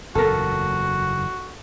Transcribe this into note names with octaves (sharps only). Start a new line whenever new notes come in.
F#1 E2 A#2 F#4 A4 A#4